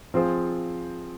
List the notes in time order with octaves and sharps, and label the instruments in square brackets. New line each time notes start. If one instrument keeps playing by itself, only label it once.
[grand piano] F3 C4 F4 G#4 C5